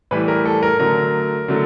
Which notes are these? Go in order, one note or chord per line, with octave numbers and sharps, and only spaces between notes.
A2 E3 G3 B4
A#4
A4
A#4
D3 F#3 A3 A#4
D3 F#3 A3